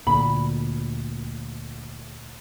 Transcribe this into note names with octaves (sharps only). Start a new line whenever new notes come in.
D2 A#2 D3 B5